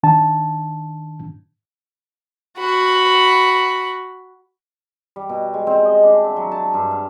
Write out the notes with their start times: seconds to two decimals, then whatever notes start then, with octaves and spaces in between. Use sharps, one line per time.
0.03 D#3 D4 A5
2.58 F#4 B5
5.16 G3
5.29 B2
5.54 G#3
5.67 C4
5.85 D#5
6.03 D4
6.24 E5
6.36 F#3
6.52 A5
6.74 G2
6.91 F5